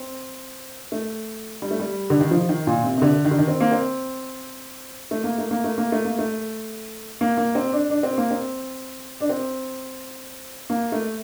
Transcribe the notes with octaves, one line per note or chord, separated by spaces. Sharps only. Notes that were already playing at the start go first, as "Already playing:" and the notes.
Already playing: C4
A3
G3
A3
G3
D3
D#3
F3
D#3
A#2
C3
C3
D3
D#3
D3
D#3
C4
A#3
C4
A3
A#3
A3
A#3
A3
A#3
A3
A#3
A3
A#3
A#3
C4
D4
D4
C4
A#3
C4
D4
C4
A#3
A3